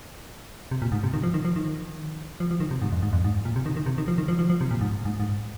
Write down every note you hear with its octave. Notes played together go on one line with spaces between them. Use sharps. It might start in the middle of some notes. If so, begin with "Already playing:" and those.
C3
A#2
G#2
C3
D#3
F3
D#3
F3
D#3
F3
F3
D#3
C3
G#2
F2
G#2
F2
G#2
A#2
C3
D#3
D#3
C3
D#3
F3
D#3
F3
F3
F3
C3
A#2
G#2
G#2
G#2